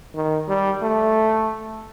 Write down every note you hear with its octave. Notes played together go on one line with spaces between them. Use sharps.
D#3
G3
A3